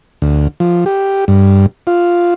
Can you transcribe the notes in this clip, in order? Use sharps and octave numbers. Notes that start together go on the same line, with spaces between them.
D2
F3
G4
G2
F4